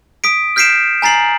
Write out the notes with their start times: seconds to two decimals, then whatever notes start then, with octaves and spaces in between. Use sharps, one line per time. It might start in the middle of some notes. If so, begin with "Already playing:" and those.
0.24 D#6 B6 D7
0.56 F6 G6 B6 C7 D7 E7
1.02 G#5 A#5 A6 C7 F#7